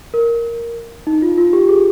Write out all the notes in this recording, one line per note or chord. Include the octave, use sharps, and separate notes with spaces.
A#4
D#4
F4
F4
G4
G#4